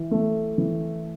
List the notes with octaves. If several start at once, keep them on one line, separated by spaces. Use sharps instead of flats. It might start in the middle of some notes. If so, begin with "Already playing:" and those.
Already playing: E3
A3
E3